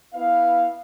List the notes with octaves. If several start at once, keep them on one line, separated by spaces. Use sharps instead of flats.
B3 E4 B4 F5